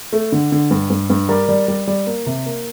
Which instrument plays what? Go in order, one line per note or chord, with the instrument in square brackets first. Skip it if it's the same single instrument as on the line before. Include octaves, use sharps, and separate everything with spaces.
[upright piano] A3
D3
D3
G2
G2
G2
G3 A#4 D5
G3
G3
G3
A#3
C3
A#3